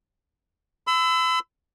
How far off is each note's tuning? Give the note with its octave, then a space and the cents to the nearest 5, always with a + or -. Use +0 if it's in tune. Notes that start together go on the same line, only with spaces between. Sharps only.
B5 +45 E6 +0